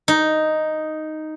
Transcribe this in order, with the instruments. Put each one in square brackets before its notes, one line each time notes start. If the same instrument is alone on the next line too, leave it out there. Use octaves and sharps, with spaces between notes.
[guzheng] D#4